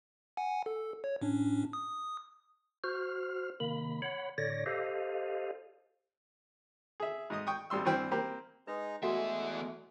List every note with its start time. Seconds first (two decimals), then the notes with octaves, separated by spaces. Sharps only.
0.37 F#5 G#5
0.66 A4
1.04 C#5
1.22 A2 C#4 D4
1.73 D#6
2.84 F#4 C5 F6
3.60 C3 D#3 A#3 B5
4.02 C#5 F#5 B5
4.38 A2 D3 C#5 D5 A#6
4.66 G4 A4 C5 D#5 F5
7.00 G#4 E5
7.30 G#2 D#5 D#6
7.47 G5 C#6 D#6
7.70 G#1 G3 C6 E6
7.85 G2 E3 C4 G5
8.11 A#3 C4 G4
8.67 G#3 D#4 B4 A#5
9.03 E2 G#3 A3 F#4 A4 E5 F#5